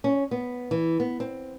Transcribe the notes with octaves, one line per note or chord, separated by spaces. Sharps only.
C#4
B3
E3
B3
C4